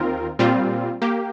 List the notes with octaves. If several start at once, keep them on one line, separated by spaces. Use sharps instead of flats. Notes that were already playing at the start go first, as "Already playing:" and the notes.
Already playing: D#2 D#3 C4 F4 A#4
A#2 G3 C4 F4
A#3 G4